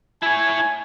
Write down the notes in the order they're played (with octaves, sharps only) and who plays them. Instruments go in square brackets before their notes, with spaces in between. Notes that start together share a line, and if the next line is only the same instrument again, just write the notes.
[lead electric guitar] E4 C#5 [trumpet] G#5